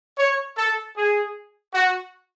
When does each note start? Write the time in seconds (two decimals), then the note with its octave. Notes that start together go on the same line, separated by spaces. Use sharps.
0.17 C#5
0.56 A4
0.95 G#4
1.73 F#4